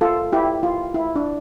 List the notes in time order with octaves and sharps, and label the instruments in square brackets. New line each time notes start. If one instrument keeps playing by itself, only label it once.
[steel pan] F4 A4
E4 G4
F4
E4
D4